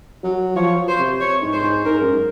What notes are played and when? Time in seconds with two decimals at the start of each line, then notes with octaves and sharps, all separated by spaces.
0.23 F#3
0.56 F3 C#5
0.88 C5
0.99 C3
1.21 C#5
1.42 G#2
1.53 C5
1.64 G#2
1.85 G#2 A#4
2.01 F#2